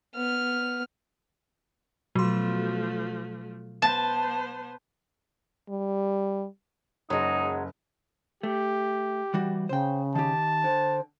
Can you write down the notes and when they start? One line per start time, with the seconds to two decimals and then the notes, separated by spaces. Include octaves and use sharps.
0.15 B3 F6
2.15 B2 F3 F#3 A3 C6
3.82 B3 C5 A5
5.69 G3
7.10 F#1 F#3 G#3 D#4
8.43 A3 G4
9.34 E3 G3 F#4
9.69 C#3 C5 G5
10.15 D#3 G4 A5
10.64 D3 C5